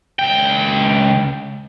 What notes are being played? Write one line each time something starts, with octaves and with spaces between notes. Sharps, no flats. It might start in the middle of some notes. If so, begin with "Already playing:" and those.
C#2 G5